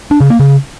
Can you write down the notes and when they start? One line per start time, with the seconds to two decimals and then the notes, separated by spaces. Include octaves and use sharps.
0.11 D4
0.20 C#3
0.30 A#3
0.40 C#3